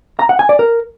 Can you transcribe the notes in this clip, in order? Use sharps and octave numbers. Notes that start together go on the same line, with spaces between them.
A#5
F#5
G#5
D5
A#4